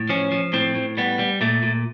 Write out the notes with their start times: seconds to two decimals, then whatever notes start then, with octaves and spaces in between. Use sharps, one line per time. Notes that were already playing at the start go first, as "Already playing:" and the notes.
Already playing: A2
0.09 F3 C#4
0.32 F3
0.53 A2 C4
0.75 A2
0.97 G3 B3
1.19 G3
1.41 A#2 A3
1.63 A#2